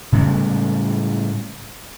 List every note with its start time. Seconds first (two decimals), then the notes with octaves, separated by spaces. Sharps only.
0.12 A2 C#3 G3 G#3